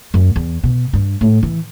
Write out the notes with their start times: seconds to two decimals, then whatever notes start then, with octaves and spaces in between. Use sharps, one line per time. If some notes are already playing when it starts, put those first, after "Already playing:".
0.14 F#2
0.36 E2
0.63 B2
0.93 G2
1.21 A2
1.43 E3